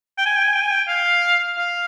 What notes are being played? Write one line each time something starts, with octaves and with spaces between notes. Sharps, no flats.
G5
G#5
G5
G#5
G5
G#5
G5
F5
F5